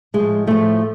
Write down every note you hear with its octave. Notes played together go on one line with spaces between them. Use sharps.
A2 G#3
F3
A2 F3 A3